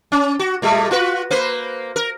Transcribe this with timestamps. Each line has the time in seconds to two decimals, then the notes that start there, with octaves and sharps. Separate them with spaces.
0.12 C#4
0.39 F#4
0.62 A#2 G3 A3
0.91 F4 F#4 B4
1.31 A#3 B4 C5
1.96 A#4